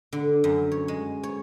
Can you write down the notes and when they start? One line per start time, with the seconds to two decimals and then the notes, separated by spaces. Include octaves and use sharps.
0.13 D3
0.44 F#2
0.72 C#5
0.88 G#3
1.23 C#5